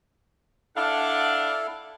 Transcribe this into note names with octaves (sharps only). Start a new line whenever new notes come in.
D4 E4 A4 F5 F#5